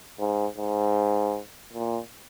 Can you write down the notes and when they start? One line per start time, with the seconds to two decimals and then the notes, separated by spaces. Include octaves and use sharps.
0.19 G#2
0.57 G#2
1.73 A#2